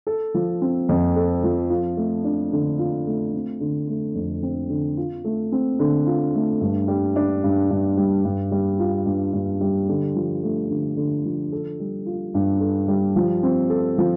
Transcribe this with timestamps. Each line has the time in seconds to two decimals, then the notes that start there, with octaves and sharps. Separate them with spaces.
0.07 A4
0.34 F3
0.62 C4
0.89 F2
1.16 A4
1.43 F3
1.70 F4
1.97 A3
2.24 D4
2.53 D3
2.79 F4
3.07 A3
3.34 C4
3.61 D3
3.88 A3
4.15 F2
4.43 C4
4.70 D3
4.97 F4
5.24 A3
5.52 C4
5.79 D3
6.07 F4
6.34 A3
6.61 G2
6.88 G3
7.16 D4
7.44 G2
7.71 G2
7.97 G3
8.25 G2
8.51 G3
8.79 F4
9.06 G2
9.33 G2
9.61 G3
9.89 D3
10.16 F3
10.43 A3
10.70 D3
10.97 D3
11.25 F3
11.52 A4
11.80 G3
12.06 F4
12.34 G2
12.61 A4
12.88 G3
13.16 F3
13.43 C4
13.70 A4
13.98 F3